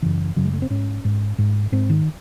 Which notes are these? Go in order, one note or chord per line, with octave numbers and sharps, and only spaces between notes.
F#2 C#3 E3
F#2 C#3 F#3
G#3
A3
C4
G#2 C#4
G#2
G#2
G#2 C4
D#3